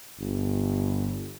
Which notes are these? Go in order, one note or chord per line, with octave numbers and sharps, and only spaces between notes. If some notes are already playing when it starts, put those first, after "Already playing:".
G1